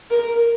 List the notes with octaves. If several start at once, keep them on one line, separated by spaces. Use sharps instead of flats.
A#4